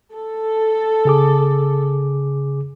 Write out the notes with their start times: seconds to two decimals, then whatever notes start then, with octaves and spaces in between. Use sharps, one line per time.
0.14 A4
1.05 C#3 G#4 D6